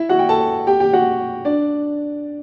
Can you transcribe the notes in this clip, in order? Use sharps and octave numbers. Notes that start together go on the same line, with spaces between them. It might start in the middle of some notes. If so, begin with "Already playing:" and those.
Already playing: E4 E5
F#4 F#5
G5
A4 A5
G4 G5
G4 G5
F#4 F#5
D4 D5